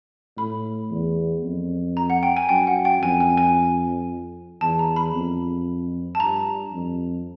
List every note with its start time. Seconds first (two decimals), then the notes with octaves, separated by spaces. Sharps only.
0.37 A2 B5
0.91 E2
1.44 F2
1.97 A#5
2.10 F#5
2.23 G5
2.37 G#5
2.49 F#2 G5
2.67 F#5
2.85 G5
3.02 F2 G#5
3.20 G#5
3.37 G#5
4.61 E2 A5
4.79 A#5
4.96 B5
5.14 F2
6.15 A5
6.20 G2 A#5
6.73 F2